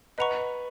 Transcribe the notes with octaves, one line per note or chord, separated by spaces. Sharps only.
B4 D#5 F#5 A#5 C#6